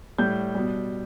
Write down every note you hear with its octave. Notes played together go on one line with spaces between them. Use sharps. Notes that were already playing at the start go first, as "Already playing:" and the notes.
A2 G3 G6
B2 G3